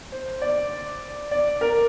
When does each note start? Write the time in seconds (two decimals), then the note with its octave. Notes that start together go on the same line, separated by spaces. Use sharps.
0.12 C5
0.42 D5
1.31 D5
1.61 A#4